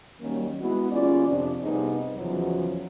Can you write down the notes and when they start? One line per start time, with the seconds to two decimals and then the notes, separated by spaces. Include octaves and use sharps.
0.21 D#3 F#3 G3 A#3 C#4
0.61 G#3 B3 E4 F#4
0.91 D#2 C#4 F4 G#4 D5
1.28 F2 C3 D4
1.63 G2 C3 B3 D#4 G#4
2.17 E2 C#3 F3 F#3